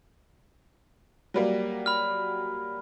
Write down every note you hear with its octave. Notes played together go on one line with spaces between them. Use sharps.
F#3 G3 A#3
B5 F6